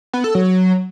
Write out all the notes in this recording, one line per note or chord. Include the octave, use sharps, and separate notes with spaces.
B3
A4
F#3